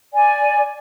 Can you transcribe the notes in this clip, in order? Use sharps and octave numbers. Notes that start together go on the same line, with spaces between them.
D5 G#5